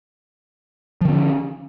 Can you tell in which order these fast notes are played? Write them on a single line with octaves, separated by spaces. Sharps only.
F3 D3 C4 C#4